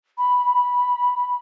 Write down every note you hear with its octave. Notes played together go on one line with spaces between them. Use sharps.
B5